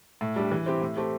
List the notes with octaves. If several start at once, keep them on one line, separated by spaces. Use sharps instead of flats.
A2
G3 D4 G4
E3
C4 E4 G4
A2
A3 C4 G4